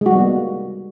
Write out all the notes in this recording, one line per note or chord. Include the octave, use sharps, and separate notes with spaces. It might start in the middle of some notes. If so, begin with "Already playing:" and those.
G3 G#3 A#3 B3 F#4